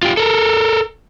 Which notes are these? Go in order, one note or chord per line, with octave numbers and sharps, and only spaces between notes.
F4 G4
A4 A#4